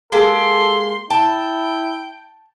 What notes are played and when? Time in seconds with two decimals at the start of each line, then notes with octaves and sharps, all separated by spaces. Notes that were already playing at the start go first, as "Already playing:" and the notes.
0.12 G#3 A#3 G4 A4 C6
1.10 E4 G5 A5